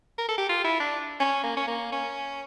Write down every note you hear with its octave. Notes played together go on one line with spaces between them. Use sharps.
A#4
A4
G4
F4
E4
D4
C#4
A#3
C#4
A#3
C#4